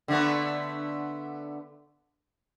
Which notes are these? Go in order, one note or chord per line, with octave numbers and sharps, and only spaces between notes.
D3 A3 B3